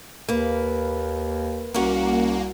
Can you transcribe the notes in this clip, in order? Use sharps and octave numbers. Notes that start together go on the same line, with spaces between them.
D#2 A#3 B4
C2 A#3 C#4 F#4 F#5